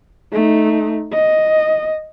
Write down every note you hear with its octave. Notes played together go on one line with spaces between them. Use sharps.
A3 D#4
D#5